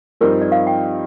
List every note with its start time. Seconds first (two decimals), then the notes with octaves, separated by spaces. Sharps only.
0.21 G2 F3 C4 D#4 A#4
0.42 D5
0.52 F5
0.67 G5